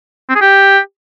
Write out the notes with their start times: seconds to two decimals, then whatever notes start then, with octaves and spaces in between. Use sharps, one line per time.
0.29 C4
0.35 G#4
0.41 G4